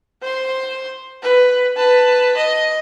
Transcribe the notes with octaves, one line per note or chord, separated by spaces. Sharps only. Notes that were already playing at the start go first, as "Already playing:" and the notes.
C5 C6
B4
B4 A5
D#5